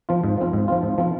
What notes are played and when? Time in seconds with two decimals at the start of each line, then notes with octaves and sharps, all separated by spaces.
0.09 F3 C4 F4
0.24 G#2
0.38 F3 C4 F4
0.53 G#2
0.68 F3 C4 F4
0.83 G#2
0.98 F3 C4 F4